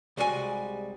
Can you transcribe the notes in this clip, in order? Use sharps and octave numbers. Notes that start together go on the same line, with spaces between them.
C2 G3 G#3 F#4 G#4 G#5